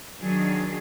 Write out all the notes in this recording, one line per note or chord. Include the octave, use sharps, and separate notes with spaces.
D#3 F#3 D4 G#4